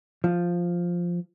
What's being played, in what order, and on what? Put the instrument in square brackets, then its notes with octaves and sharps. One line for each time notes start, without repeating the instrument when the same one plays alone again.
[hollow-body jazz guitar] F3